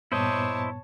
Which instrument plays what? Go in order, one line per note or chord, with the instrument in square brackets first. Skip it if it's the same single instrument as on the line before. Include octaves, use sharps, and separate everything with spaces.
[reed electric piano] G2 A#2 B3 [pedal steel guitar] E4 C5 D#5 [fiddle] C#5 A5